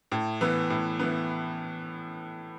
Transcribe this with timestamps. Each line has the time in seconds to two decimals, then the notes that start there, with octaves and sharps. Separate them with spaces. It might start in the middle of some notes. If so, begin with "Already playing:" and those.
0.12 A2
0.41 E3 B3
0.70 A2
0.99 E3 B3